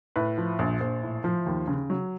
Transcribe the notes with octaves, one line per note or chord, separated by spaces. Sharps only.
A2 B4
F3
A#1
A#1 C5
A2
F3
D#2
C#3
F#3